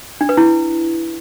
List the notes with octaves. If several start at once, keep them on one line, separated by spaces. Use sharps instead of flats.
D4
B4
E4